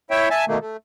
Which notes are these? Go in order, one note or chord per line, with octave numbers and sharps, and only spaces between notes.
E4 C#5 E5 G5
E5 G#5 A5
B2 D#3 A3 A#3
A3